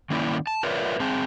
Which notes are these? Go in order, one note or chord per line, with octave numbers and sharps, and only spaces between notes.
D#3 A#3 C#4 E4 D5
A5
F4 A#4 B4 C#5 D5 E5
C4 G#4 A5